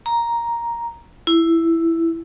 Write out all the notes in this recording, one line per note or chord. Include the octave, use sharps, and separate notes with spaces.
A#5
E4